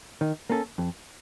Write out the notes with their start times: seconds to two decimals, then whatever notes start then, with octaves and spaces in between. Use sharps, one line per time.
0.21 D#3
0.50 A#3 C#4 A4
0.78 F2